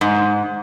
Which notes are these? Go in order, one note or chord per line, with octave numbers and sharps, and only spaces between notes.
G#2